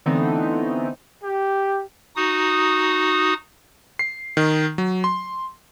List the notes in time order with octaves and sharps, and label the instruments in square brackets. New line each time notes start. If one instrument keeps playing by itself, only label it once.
[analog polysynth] D3 E3 A3 B3 C4 D#4
[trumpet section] G4
[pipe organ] D#4 F#4 D#6
[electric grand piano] C7
D#3
F#3
C6